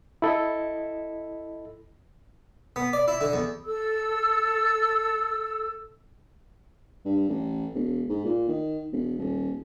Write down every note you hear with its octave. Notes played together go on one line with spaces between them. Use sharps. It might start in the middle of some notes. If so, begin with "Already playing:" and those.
E4 A4 D#5
B3
D5
E4
D3
E2
A4 E6
G2
A1
E1
G#2
A#2
D#3
E1
D#1